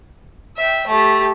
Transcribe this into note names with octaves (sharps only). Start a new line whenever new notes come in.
E5 G5
A3 G4